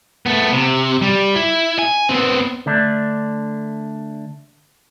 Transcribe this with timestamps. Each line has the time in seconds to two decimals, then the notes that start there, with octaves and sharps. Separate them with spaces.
0.26 A3 B3
0.53 C3
1.02 G3
1.35 E4
1.79 G#5
2.09 B3 C4
2.66 D3 A3 D4